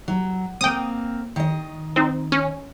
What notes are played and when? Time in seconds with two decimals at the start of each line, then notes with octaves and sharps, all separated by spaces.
0.08 F#3
0.61 A#3 C4 G5 D#6
1.36 D#3 D#5
1.96 C4 D#4
2.32 C#4